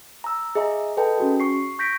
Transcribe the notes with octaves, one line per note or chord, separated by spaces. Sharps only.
A#5 E6
G#4 D#5 E5 A#5
A4 B4 D#5 G5 A5
C#4 F#4 G#4
C#6 C7
C#6 G6 A#6 B6 D7